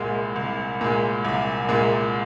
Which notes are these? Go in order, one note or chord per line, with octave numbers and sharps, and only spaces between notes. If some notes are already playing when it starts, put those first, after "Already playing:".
Already playing: C2 A#2 G#3
C2
A#2 G#3
C2
A#2 G#3